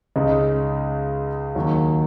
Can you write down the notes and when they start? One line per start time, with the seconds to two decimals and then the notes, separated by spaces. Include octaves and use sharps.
0.16 C#2 C#3 G#3 D#4
1.55 D#2 D#3 F#3